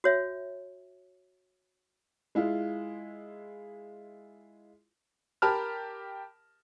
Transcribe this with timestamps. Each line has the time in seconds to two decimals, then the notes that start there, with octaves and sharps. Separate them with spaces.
0.04 F#4 C#5 E5
2.35 G#3 E4 F4
5.42 G4 A#4 A5 B5 F6